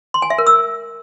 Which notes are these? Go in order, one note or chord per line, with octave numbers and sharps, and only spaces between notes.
C6
G#5
E5
A#4
E6